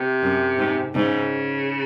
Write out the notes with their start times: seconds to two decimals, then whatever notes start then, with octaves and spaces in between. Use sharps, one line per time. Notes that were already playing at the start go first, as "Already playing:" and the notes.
Already playing: C3
0.22 F#2
0.58 G#2
0.94 G#2 C#3